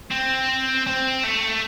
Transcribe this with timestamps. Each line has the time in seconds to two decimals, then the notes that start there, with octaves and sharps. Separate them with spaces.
0.11 C4
0.87 C4
1.24 A3